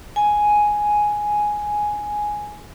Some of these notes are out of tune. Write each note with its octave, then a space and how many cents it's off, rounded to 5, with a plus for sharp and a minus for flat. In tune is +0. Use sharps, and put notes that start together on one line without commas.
G#5 +5